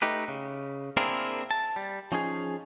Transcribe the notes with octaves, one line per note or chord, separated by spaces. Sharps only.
A3 D#4 G4 B4
C#3
A#3 C4 D4 E4 G#4 A#4
A5
G3
F3 C#4 D#4 G#4